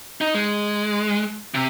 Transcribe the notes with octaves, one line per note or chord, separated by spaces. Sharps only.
D#4
G#3
C3